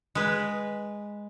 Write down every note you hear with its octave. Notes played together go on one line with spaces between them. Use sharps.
G#3 B4